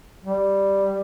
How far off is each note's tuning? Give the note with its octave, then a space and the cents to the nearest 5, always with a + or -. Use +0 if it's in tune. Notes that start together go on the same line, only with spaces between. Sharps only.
G3 +0